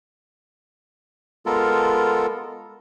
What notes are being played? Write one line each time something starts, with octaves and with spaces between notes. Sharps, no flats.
G#3 B3 F4 A4 A#4